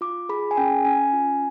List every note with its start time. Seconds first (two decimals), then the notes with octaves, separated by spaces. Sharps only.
0.01 F4 D6
0.29 G#4 B5
0.51 G#5
0.57 C#4 G5
0.85 C#4 G#5
1.13 F4